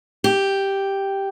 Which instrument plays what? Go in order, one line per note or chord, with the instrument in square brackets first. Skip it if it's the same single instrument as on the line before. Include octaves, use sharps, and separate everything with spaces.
[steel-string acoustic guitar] G4